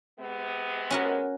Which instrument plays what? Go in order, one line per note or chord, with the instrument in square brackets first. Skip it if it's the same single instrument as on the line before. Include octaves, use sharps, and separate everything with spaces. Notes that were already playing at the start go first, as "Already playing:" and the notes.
[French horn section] C3 G#3 B3
[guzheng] C#4 F#4 A#4